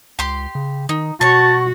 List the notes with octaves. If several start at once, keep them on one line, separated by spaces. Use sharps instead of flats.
C#2 G4 C6
C#3
D#3 D#4
B2 F#4 C#5 A5 C#6